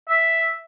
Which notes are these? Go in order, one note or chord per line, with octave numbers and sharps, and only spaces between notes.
E5